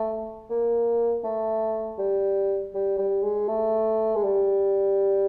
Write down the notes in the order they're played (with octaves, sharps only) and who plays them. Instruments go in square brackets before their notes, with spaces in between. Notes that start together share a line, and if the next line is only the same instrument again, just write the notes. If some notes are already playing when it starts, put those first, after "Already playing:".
Already playing: [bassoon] A3
A#3
A3
G3
G3
G3
G#3
A3
G#3
G3